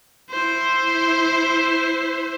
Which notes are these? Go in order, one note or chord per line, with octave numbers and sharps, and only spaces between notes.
E4 C5